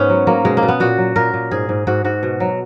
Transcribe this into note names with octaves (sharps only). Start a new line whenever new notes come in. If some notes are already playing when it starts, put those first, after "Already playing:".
Already playing: G#2 B3 C#4
F#3
F#3 A#3
B2 G#3
A#3
B2
B3
A#2 F#4
F#3
A#2 A#4
A#2
G#2 G#4
G#2
G#2 F#4
G#2 F#4
B2
F#3